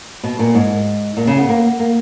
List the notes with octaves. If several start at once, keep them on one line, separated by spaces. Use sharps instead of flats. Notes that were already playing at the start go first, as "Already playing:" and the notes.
B2
A#2
G#2
A#2
C#3
B3
A#3
A#3